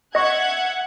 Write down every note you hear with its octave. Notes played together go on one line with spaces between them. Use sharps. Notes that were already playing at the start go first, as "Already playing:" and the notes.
D#5 E5 F#5 C#6 F#6 G#6